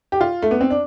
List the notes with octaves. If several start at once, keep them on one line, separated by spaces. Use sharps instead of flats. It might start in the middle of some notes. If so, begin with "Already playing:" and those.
G4
F4
A3
B3
C4
D4